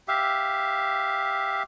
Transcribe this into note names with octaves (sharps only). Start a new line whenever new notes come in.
G4 E5 F5